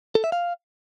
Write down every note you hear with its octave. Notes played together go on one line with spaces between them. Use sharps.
A4
E5
F5